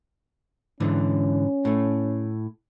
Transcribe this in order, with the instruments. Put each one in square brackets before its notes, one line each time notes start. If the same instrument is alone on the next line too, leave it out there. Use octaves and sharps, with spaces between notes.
[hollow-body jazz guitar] G#2 D3 E3 [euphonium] C#4
[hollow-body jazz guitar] A2 A3